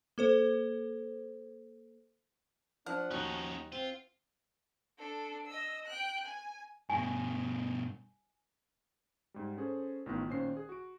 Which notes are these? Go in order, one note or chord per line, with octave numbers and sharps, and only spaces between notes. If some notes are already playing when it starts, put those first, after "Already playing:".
A#3 A4 C5
F3 D4 F#5 F6
D#2 F3 C#4 D#4 F#4 F#6
C4 F4
D4 A4
D#5 E6
G5 F#6
G#5
G2 B2 G#5
G#2 G3
C#4 G#4 A4 C5
A1 D#3 B3 F4 F#6
A#2 D#3 C#4 C5 C7
G#4
F#4 D7